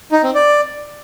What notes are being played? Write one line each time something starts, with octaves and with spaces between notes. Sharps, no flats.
D#4
C4
D5